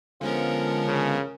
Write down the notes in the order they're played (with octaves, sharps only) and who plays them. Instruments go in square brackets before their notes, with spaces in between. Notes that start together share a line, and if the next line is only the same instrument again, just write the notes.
[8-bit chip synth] D3 G#3 B3 [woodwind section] F3 [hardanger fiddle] C#4 A#4
[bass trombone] C#3